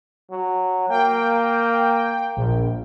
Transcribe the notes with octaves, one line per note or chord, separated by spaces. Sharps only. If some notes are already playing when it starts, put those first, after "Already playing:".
F#3
A#3 G5
A#1